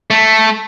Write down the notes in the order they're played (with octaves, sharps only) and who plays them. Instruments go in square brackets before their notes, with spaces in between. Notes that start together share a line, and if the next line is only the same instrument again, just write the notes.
[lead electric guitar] A3